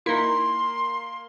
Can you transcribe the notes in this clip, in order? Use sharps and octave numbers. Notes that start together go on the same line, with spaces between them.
A#3 D#4 E4 C6